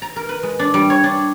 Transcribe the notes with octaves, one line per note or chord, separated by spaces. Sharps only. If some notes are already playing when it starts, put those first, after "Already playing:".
A#5
A#4
B4
G#3
D4
G3
C#5
D4